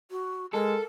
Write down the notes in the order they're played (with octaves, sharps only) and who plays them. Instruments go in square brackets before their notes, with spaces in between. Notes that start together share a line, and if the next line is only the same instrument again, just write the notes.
[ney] F#4
[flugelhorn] G#3 [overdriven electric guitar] A4 [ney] A#4